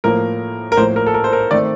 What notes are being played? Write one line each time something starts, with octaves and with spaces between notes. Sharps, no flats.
A2 F3 A#3 A#4
A#4
A2 F3 A#3 C5
A#4
A4
A#4
C5
A#4
D#3 A3 C4 D5